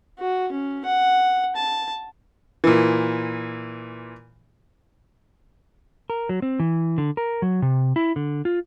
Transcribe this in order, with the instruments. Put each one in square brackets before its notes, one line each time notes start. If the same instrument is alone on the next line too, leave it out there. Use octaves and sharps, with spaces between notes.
[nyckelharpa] F#4
C#4
F#5
A5
[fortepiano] A#2 E3
[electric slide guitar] A#4
F#3
C4
E3
D3
A#4
F#3
C3
E4
D3
F4